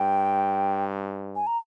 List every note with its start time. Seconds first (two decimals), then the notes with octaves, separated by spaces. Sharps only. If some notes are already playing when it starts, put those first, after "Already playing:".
Already playing: G2 G5
1.36 G#5
1.47 A#5